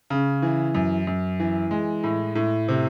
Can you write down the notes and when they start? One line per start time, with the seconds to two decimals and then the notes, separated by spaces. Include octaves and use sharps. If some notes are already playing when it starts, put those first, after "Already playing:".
0.10 C#3
0.42 E3
0.75 F#2
1.07 F#2
1.40 E3
1.71 G#3
2.04 A2
2.35 A2
2.68 C3